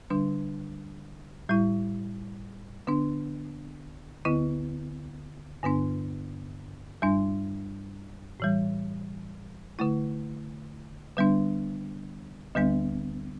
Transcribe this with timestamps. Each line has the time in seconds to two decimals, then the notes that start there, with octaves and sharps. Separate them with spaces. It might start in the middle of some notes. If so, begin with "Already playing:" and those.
0.10 D3 G3 D4
1.49 A2 G3 E4
2.87 D3 B3 D4
4.25 D2 D3 B3 E4
5.63 G2 D3 B3 D4
7.02 G2 G3 D4
8.40 A2 E3 G3
9.79 D3 A3 E4
11.17 D3 G3 B3 D4
12.55 D2 D3 G3 B3 D4